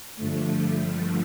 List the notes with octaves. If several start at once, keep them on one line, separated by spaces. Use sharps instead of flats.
G2 D3 F3 A3